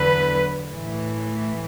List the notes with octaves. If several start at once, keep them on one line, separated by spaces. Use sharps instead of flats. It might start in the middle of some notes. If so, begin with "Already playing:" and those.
Already playing: E2 D3 F#3 B4
A2 E3